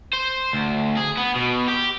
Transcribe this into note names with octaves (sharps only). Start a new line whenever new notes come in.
C5
D2
G#4
B3
B2
G4